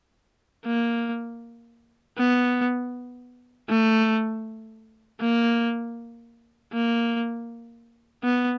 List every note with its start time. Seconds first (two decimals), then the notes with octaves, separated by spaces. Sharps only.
0.65 A#3
2.18 B3
3.69 A3
5.21 A#3
6.73 A#3
8.24 B3